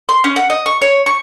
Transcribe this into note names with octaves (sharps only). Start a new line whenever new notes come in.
C6
C#4
F#5
D#5
C#6
C#5
C#6